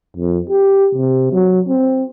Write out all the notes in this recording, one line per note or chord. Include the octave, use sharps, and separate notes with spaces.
F2
G4
C3
F#3
C4